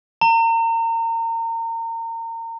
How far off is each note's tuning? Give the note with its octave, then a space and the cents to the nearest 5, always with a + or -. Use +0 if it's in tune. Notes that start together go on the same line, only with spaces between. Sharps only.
A#5 -30